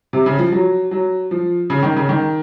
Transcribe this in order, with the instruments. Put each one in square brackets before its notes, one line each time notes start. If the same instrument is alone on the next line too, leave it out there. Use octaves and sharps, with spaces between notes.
[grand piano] C3
C#3
F3
F#3
F#3
F3
C#3
D#3
C#3
D#3